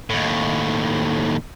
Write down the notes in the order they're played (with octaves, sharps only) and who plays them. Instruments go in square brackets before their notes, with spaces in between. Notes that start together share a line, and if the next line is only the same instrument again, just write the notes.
[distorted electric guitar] D#2 A2